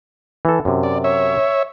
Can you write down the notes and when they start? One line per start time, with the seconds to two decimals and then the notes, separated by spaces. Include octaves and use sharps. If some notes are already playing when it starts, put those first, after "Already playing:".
0.45 E3 A4
0.65 F#2 C3
0.83 D5
1.04 C#5 E5